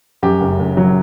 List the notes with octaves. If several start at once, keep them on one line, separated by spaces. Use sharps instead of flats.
F#2 G4
F#1
F#1
F#3